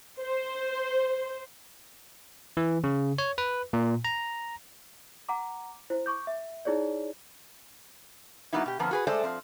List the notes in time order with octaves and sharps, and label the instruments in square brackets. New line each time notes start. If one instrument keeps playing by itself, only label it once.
[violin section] C5
[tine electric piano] E3
C#3
C#5
B4
A#2
A#5
[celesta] F#5 A#5 D6
E4 C5
C#6 D6 G6
E5
D#4 E4 G#4 C#5 D5
[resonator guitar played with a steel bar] F#3 A#3 B3 D#4 E4
B2 G4
F2 D3 F3 A#3 B3
F#4 G#4 B4
G#3 A3 A4 C5 D5
F3 C4